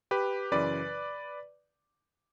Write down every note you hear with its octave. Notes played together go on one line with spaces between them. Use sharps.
G4 B4
F#2 C#3 E3 B4 D5